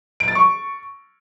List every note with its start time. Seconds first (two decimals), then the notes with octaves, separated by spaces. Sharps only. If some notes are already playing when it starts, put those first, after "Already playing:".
0.20 D7
0.28 A6
0.35 C#6